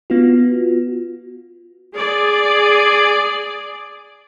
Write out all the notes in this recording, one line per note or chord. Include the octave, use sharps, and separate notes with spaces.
B3 F4 F#4
G#4 D5